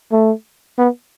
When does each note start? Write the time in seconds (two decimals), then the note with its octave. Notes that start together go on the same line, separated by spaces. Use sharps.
0.12 A3
0.78 B3